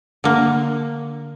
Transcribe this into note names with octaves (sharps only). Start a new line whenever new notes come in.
D3 A#3